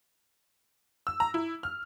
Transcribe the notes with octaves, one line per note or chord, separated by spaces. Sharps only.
E6
A#5
E4
F6